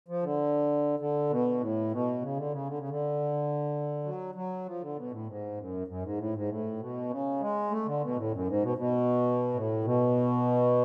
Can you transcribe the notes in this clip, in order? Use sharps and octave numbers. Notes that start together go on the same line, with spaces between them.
F3
D3
D3
B2
A2
B2
C#3
D3
C#3
D3
C#3
D3
F#3
F#3
F3
D3
B2
A2
G#2
F#2
F#2
G#2
A2
G#2
A2
B2
C#3
G#3
A3
D3
B2
A2
F#2
G#2
B2
B2
A2
B2